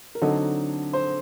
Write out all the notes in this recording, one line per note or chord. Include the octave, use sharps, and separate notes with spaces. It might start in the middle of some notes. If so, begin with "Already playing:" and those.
A#4
D3 F#3 C4 D#4 A4
C5